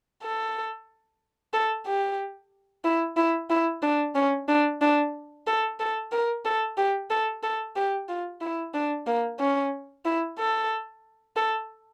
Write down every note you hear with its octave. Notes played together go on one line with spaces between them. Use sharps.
A4
A4
G4
E4
E4
E4
D4
C#4
D4
D4
A4
A4
A#4
A4
G4
A4
A4
G4
F4
E4
D4
A#3
C#4
E4
A4
A4